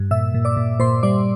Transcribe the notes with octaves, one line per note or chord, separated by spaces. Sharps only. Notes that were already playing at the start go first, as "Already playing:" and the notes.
Already playing: G2
A#2 E5 E6
A#2
D5 D6
A#2
A#2 C5 C6
G3 D5 D6